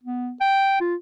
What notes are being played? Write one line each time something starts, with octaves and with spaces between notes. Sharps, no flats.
B3
G5
F4